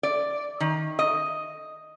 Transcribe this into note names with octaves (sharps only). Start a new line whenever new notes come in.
D5
D#3
D#5